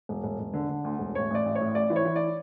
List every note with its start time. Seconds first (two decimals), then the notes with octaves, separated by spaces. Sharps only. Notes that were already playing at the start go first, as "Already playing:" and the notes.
0.09 E1
0.24 E1
0.39 E1
0.54 D3
0.69 D3
0.84 D2
0.99 E1
1.15 A1 C#5
1.30 A1 D5
1.46 A1
1.55 C#5
1.61 A2
1.75 A1 D5
1.90 E3
1.96 C#5
2.05 E3
2.16 D5